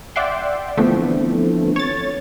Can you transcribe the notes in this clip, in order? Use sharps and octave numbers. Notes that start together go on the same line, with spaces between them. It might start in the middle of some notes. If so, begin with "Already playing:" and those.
D5 E5 F#5 G5 C6
D3 E3 F3 A3 B3 C4
C#5 A6